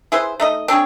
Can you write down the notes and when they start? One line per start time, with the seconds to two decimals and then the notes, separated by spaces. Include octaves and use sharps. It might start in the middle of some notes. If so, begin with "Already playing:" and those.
0.12 E4 G#4 B4 C5
0.40 A3 D#4 D#5
0.68 C4 D4 G#4 C#5